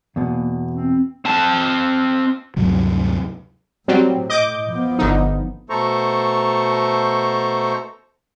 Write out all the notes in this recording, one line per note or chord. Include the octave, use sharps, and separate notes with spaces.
E2 B2 A#3
C4
C4 A5
D2 G2 C3 F#3
A2 F#3 G3 C4
D#5 D6 G6
F3 B3
G1 D3 D#4
B2 A3 A4 C5 A#5 C#6